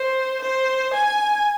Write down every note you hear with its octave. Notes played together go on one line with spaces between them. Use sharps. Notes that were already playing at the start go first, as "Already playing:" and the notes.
Already playing: C5
C5
G#5